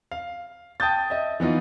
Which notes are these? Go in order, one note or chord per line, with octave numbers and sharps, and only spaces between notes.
F5
G5 A5 D#6 G6 A6
D#5 E5
E3 B3 D#4 F4